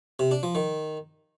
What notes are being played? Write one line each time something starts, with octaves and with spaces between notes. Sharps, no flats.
C3
D4
F3
D#3